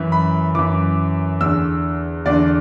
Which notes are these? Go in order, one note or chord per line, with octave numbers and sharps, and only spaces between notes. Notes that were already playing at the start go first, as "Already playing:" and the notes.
Already playing: F#2 E3
B5
F#2 E3 D6
E2 D3 E6
E2 D3 D5